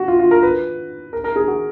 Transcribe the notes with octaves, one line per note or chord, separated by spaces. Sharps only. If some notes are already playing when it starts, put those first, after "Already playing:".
Already playing: F#4
F4
F4
A#4
B4
A#4
A#4
G#4
F#4